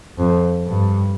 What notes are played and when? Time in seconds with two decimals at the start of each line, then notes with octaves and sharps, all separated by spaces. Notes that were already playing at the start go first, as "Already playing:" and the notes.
0.19 F2
0.67 G2